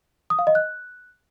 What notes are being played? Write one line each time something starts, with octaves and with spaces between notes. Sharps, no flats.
D#6
F5
D#5
F#6